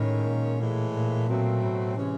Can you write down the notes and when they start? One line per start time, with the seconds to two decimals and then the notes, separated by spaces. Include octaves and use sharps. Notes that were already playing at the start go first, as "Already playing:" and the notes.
Already playing: A2 D#3 G#3 C#4
0.24 A#2
0.58 A2 E3 G#3
0.92 A#2
1.27 B2 F#3 A3 C4
1.60 A2
1.95 C3 E3 G#3 C#4